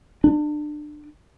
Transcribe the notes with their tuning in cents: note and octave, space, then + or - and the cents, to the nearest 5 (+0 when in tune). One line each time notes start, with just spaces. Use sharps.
D4 +30